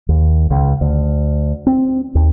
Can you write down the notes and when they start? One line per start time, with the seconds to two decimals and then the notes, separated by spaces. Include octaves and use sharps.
0.09 D#2
0.50 C#2
0.81 D2
1.67 C4
2.15 D#2